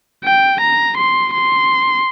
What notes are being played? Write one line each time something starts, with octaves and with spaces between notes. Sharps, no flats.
G5
A#5
C6
C6